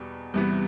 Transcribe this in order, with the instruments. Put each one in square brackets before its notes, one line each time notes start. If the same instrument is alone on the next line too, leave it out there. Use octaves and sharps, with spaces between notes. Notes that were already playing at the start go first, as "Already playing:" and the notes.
Already playing: [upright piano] E2 B2 G3
[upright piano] E2 C3 E3 B3 [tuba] G3